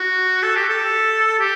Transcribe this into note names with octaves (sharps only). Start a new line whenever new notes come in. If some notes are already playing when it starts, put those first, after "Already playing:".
Already playing: F#4
A4
G4
A4
G4